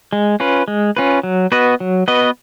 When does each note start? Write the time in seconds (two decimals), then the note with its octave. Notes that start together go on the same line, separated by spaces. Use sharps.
0.13 G#3
0.40 C#4 F4 B4
0.68 G#3
0.97 C#4 F4 B4
1.23 F#3
1.52 B3 F#4 B4 D#5
1.80 F#3
2.08 B3 F#4 B4 D#5